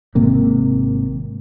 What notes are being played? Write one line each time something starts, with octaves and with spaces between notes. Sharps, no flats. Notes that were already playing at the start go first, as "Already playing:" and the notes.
G#1 G#2 C3 A#3